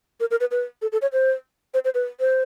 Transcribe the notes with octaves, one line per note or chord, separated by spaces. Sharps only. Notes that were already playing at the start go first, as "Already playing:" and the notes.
A#4
A#4
B4
B4
A4
A4
C#5
C5
C5
C5
B4
C5